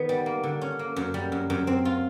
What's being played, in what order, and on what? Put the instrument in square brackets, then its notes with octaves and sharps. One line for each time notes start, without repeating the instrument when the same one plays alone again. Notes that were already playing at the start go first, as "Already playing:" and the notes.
Already playing: [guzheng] D#3 B3
G3
A#3
D3
C#4
A#3
F#2
G3
F#2
F#2
C4
F4